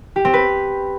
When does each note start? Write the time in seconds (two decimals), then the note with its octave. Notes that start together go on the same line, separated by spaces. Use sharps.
0.16 G4
0.25 C4
0.34 B4